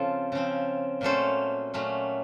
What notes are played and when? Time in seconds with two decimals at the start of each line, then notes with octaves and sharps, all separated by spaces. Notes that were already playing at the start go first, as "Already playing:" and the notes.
Already playing: C#3 F3 C4 F4 A4
0.32 C#3 F3 C4
1.01 A#2 F#3 A3 C#4 A4 C5
1.74 A#2 F#3 A3 C#4